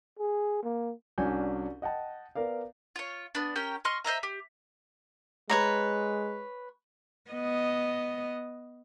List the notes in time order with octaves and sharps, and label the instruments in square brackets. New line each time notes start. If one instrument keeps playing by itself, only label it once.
[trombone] G#4
A#3
[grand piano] C2 C#4 D4 F#4 G#5 G6
D#5 F#5 G5 A5
B3 A#4 D5 F5
[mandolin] F4 C#5
B3 D4
C#4 G4 A#4 G5
D#5 C6 C#6 F6
C5 D#5 E5 A#5
G4
[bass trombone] G#3 [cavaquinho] B4 C#5 A#5
[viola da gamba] B3 D#5